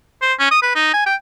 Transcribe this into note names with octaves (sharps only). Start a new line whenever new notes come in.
C5
C#4
D#6
B4
D#4
G#5
G5